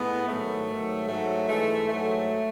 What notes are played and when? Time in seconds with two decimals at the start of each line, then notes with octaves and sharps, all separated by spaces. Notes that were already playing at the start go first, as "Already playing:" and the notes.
Already playing: A2 G#3 B3
0.27 G#2 D#3 F#3 A3
0.67 G#2 D#3 F#3
1.07 G#2 F#3 A3
1.47 G#2 E3 G#3 A3
1.88 G#2 F#3 A3